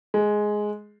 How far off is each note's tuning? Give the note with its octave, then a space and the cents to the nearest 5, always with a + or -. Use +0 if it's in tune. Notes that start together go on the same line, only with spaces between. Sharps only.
G#3 +5